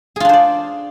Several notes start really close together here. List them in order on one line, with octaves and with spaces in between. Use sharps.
G#4 F4 D4 C5 D5